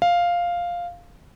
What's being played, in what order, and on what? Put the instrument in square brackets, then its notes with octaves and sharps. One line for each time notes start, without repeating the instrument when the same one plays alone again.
[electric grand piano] F5